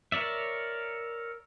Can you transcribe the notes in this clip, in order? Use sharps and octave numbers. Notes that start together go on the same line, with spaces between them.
A#4 C#5 D5 E5